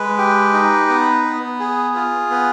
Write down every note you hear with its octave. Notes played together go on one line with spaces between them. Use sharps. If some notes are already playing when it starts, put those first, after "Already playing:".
Already playing: G#3 B4
G4
D#4
B3
B3
G#4
F4
B3